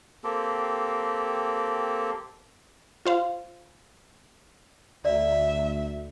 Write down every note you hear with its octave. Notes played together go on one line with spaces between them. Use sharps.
A#3 C4 G4 A4
F4 C5 F5
D2 D5 E5